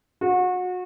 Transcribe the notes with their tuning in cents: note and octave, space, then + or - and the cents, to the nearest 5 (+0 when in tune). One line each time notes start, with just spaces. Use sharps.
F#4 -30